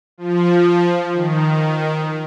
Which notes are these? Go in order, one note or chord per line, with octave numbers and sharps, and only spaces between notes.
F3
D#3